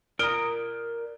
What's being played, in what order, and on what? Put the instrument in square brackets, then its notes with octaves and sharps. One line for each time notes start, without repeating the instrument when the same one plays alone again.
[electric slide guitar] A#4 D5 [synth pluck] A#5 D#6 [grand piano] F6 D7 G7